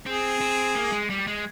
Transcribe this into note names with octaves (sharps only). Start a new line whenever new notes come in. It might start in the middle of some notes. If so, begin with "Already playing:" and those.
C4 G#4
C4
A#3
G#3
G3
G#3